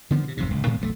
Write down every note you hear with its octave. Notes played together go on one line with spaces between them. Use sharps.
D3 D#3 F3 B3
C3 F3
E1 F2 G#2 C3
D1 C#2
A2 D#3 G#3 B3
F1 B1 C3 A3